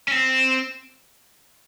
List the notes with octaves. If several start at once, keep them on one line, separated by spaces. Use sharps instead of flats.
C#4
C4